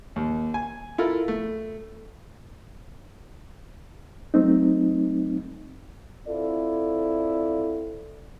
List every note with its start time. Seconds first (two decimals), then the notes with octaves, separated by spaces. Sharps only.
0.16 D#2
0.54 G#5
0.98 E4 F4 A4 A#4
1.28 A3
4.34 F#3 A3 C4 D#4
6.28 C4 E4 F4 A4 D5